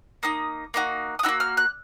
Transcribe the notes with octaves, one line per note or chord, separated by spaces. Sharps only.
A#3 D#4 D#6
A#3 D#4 F#4
D#6
D#4 F#4 E6
A#3
F6
F#6